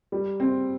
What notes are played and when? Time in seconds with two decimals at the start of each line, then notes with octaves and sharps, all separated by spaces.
0.12 G3
0.40 C4